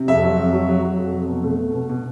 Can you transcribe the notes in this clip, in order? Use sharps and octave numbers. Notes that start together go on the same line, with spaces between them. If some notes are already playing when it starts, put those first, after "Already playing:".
Already playing: C3
F2 E5
F#3
F2
F#3
F#3
F#3
F2
F2
B2
A3
B2
B2
B2